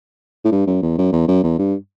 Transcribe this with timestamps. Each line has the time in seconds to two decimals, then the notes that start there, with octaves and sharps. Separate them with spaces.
0.45 A2
0.52 G2
0.67 F#2
0.82 E2
0.98 F#2
1.12 E2
1.28 F#2
1.43 E2
1.58 G2